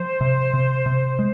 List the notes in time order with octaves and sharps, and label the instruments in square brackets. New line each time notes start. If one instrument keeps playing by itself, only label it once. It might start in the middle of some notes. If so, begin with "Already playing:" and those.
Already playing: [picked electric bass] F3 [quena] C5
[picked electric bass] C3
C3
C3
G#3